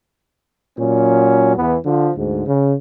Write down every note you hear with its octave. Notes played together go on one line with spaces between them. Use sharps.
A#2 F#3 C#4
E2 E3 B3
D3 F3
D2 G#2
C#3